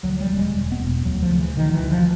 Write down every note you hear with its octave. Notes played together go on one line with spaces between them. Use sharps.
D2 F#3
G3
E1
G#3
E1
B3
E1
D2 F#3
F3
C#3
E3
D2 D#3
E3
D2
F3